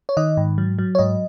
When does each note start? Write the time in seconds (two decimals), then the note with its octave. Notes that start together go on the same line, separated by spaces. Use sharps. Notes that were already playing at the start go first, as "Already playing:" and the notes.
0.09 C#5
0.17 D#3 D#5
0.37 G#2
0.58 F#3
0.79 F#3
0.95 C#5
0.99 G#2 D#5